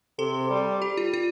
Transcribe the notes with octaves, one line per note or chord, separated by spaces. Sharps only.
C3 A4
G3
G4
F4
F4